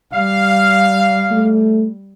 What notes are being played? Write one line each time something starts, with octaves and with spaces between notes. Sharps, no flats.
G3 F5
A3